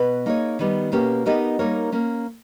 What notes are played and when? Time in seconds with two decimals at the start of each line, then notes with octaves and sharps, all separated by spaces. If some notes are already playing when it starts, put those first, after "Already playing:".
Already playing: B2 B4
0.26 A#3 D#4 G#4 C#5
0.59 D#3 G3 B3 G4
0.92 B2 A#3 C#4 G4
1.26 B3 D#4 G4 A#4 D#5
1.59 G3 A#3 D#4 A#4 C#5
1.92 A#3 C#4